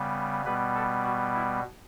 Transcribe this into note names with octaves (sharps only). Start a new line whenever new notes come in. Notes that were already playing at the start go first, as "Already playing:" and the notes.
Already playing: C#3 G3 B3
B2 G3 B3 B4
A4
F#4
E4